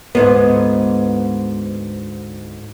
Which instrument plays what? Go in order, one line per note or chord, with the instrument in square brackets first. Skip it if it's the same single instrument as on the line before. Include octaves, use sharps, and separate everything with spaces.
[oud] D2 G#2 B3